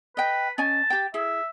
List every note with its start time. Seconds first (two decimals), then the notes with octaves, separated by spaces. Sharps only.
0.17 B4 D#5 G5
0.58 C#4 D#5 G#5 A5
0.90 G4 G5
1.14 E4 G#4 E5